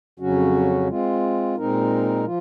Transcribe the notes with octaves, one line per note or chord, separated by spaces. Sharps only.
F2 C#3 F#3 C#4 F#4
G#3 C4 F4
A#2 G#3 C4 D#4 A#4
F3 F4